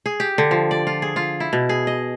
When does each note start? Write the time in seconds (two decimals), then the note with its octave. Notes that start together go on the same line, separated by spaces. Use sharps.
0.06 G#4
0.20 G4
0.38 D3
0.51 F3
0.71 D5
0.87 F4
1.02 G#4
1.16 F4
1.40 E4
1.53 B2
1.69 G#4
1.87 D#5